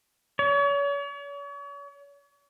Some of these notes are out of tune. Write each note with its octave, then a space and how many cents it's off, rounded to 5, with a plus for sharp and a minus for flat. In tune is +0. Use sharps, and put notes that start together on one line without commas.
C#5 +40